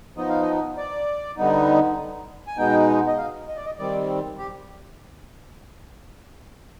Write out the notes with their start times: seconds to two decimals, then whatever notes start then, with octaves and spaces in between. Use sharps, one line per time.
0.17 F3 B3 D#4 D#5
0.29 F5
0.41 D#5
0.77 D5
1.37 D3 G3 B3 D#4
2.47 G#5
2.57 B2 G#3 B3 D#4 G5
3.07 D#5
3.17 F5
3.48 D#5
3.57 D5
3.66 D#5
3.79 D#3 G3 C4 D5
4.38 G4